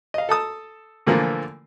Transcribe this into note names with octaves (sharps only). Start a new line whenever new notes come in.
D#5 F5
A4 A5 D#6
A#2 D3 E3 F3 A3 A#3